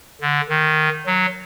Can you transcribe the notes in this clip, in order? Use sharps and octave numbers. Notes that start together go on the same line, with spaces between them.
D3
D#3
F#3